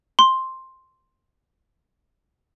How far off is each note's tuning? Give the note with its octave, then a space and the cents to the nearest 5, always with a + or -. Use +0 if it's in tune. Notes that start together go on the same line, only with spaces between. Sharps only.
C6 +5